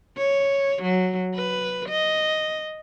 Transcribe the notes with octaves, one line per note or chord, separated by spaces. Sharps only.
C#5
F#3
B4
D#5